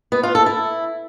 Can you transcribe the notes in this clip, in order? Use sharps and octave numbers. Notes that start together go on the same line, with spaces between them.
B3
F4
A4
E4